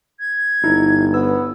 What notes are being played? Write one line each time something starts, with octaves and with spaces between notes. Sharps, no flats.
G#6
G1 D#4 E4
B3 E6